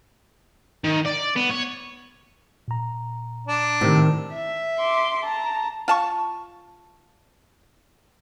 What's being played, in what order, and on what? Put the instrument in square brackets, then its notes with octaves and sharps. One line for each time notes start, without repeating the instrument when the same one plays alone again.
[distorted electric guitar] D#3
D5
B3
C#5
[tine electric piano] A#2 A#5
[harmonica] D4
[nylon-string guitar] A2 C3 [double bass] D#3
[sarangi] E5
[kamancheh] C6 D6
A5 A#5
[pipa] F4 A5 C#6